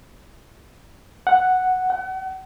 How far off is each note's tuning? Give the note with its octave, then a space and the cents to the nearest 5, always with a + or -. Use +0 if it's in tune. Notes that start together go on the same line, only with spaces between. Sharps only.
F#5 +0
F#5 +40